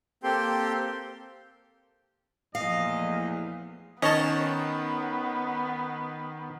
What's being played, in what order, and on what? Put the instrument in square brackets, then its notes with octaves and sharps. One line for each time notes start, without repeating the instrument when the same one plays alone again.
[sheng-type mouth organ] A#3 C4 G4 A4 G5 C6
[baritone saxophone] E2 [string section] A#2 F3 A3 [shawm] D#5 [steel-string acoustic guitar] F5
[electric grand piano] D#3 [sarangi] B3 [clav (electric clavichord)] C#4 C#5 [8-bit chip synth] D#5 A5